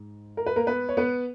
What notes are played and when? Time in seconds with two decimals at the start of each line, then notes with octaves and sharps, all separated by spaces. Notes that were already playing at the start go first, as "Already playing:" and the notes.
Already playing: G#2
0.37 A#4
0.47 B4
0.56 A#3 A#4
0.67 B3 B4
0.89 C#5
0.97 B3 B4